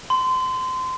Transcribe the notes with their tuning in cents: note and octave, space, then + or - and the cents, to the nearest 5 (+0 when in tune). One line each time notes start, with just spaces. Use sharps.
C6 -25